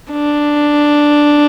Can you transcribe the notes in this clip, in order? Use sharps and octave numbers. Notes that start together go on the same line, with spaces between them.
D4